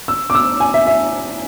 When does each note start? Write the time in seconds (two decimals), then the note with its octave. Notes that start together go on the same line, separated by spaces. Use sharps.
0.08 E6
0.30 D6
0.35 E6
0.60 G#5
0.74 E5
0.87 E5